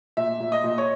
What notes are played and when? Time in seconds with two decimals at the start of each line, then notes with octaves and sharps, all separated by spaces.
0.17 A#2 E5
0.40 A#2
0.52 D#5
0.64 A#2
0.78 C#5